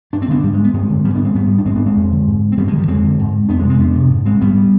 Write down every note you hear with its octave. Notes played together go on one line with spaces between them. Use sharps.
G2 D4
C4
D3 B3 D4
G#2 G3
G#3
B3
G2 G#3 C4
D3
G#2 G3 B3
B3 D4
G#3 C4
G#2 G3 B3
D4
G#2 G#3 C4
B3 D4
G#3 C4
F2
D3
G#2
C4
G2 G3 B3
F3 G#3
D3
D#3 G3
F2 G#3 C4
D3
G#2
F2 B3 D4
G#3 C4
C3
G#3 C4
F2 B3 D4
C3
G#2
G#3 C4
G#2 G3 B3